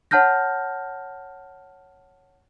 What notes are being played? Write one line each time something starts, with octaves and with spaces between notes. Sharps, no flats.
C#5 F#5 A5 F6 G6 A#6